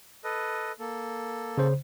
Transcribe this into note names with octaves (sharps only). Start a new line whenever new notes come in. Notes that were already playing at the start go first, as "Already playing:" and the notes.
A4 B4 D#5
A#3 A4
C#3 C5